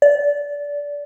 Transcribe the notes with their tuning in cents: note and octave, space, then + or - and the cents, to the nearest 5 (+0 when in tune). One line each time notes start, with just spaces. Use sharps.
D5 -20